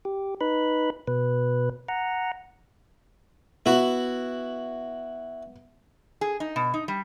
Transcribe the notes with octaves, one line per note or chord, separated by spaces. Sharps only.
G4
D#4 B4 B5
B2 B4
F#5 A#5
B3 E4 F#4
G#4
D#4
B2
D#4
G3